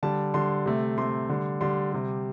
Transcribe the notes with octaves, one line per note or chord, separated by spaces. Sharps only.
D3 G3 A5
D3 G3 C6
C3 A3
C3 A3 C6
D3 G3
D3 G3 C6
C3 G3